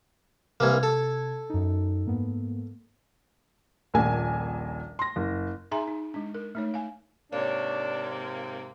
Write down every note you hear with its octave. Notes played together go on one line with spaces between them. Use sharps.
C2 C3 E3 A#3 G#6
A4
F#2 D#4
G#2 A#3 B3
D#1 A#1 A#3 G#5
C6 A#6
F#1
D#4 G#4 E5 G#5 A#5 C6
D#4
G#3 D4
A#4
A3 D#4 C#5
F5 G#5
G#2 C3 A#3 D4 C#5